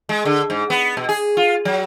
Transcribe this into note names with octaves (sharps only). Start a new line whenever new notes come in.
G#3
D3
G#2
B3
B2
G#4
F4
F#3